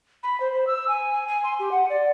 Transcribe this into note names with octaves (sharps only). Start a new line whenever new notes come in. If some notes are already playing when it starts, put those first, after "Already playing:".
B5
C5
C5
E6
G#5
G#5
G#5
C6
G4
F#5
D5